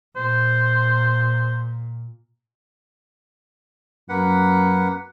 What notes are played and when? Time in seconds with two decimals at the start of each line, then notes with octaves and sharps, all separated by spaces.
0.16 A#2 C5
4.09 F#2 A#3 B4 F#5